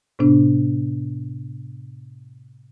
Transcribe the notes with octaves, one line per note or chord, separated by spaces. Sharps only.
A2 C3 B3 D4